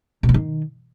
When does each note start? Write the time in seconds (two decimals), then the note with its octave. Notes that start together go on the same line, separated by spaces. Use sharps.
0.23 B2
0.29 B3
0.34 D#3